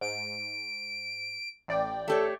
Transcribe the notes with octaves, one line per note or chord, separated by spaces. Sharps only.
G#2 D7
A1 D5 G5
A3 G4 A4 C#5